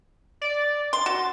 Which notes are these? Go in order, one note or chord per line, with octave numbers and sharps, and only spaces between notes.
D5
C6 A6
F#4